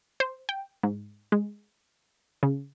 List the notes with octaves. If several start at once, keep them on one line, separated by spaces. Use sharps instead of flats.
C5
G5
G#2
G#3
C#3